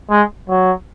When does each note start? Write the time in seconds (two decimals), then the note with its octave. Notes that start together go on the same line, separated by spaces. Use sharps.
0.10 G#3
0.49 F#3